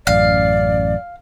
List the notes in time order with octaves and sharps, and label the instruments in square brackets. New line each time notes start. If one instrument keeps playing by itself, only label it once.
[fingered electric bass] A1 F#2 [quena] D5 [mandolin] F5